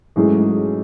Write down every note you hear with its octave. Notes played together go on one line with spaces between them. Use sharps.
G#2 E3 F#3 G#3 A3 C#4 G#4